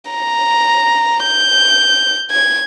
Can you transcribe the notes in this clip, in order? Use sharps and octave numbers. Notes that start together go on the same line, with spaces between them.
A#5
G6
G#6